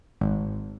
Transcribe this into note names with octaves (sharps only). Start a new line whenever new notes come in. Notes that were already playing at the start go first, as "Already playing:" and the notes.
G#1